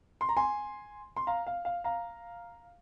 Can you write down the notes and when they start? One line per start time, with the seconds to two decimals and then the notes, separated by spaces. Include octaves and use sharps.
0.21 C6
0.29 A#5
0.37 G#5 C6
1.17 C6
1.27 F5 A#5
1.47 F5
1.65 F5
1.84 F5 A#5